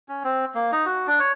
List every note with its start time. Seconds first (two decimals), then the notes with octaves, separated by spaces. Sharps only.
0.09 C#4
0.24 C4
0.55 A#3
0.72 D#4
0.86 F#4
1.07 D4
1.20 C#5